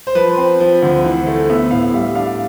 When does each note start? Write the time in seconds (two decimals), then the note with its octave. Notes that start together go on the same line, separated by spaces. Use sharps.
0.07 C5
0.15 F3 B4
0.37 C4
0.60 F3
0.82 D2
1.04 E3
1.27 A3
1.50 B3 E5
1.71 A2 F5
1.93 G3 E5
2.15 D4 F5